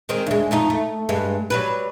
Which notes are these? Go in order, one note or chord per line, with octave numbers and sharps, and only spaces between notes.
D#3 G#3 C4
D2 G#3
F2 A3 D#4
A3
G2 G#3
F#3 G3 B4